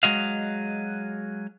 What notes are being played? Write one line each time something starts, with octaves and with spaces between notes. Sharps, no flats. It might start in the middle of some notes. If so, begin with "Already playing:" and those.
F#3 G#3 F#4 D#5 F5